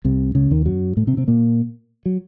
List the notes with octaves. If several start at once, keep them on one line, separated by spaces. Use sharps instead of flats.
C2 C3
C#2 C#3
D#2 D#3
F#2 F#3
A2 A3
C3 C4
C3 C4
A#2 A#3
F#3